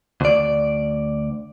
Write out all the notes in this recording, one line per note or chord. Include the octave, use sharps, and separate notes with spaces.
D2 D5